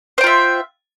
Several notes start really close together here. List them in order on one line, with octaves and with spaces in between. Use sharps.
C5 G5 F4 E5